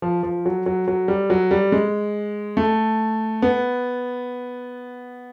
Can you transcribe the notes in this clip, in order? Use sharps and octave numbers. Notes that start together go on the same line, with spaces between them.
F3
F3
F#3
F#3
F#3
G3
F#3
G3
G#3
A3
B3